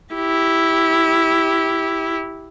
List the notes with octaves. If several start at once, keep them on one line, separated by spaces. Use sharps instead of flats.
E4 G4